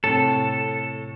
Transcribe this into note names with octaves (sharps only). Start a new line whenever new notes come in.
A2 C3 A4